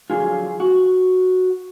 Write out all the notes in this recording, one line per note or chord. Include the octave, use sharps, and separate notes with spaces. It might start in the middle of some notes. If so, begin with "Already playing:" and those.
F2 D3 F#3 F4 G#4
F#4